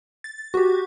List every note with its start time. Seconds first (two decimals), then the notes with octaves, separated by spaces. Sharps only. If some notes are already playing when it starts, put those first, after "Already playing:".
0.24 A6
0.54 F#4 G4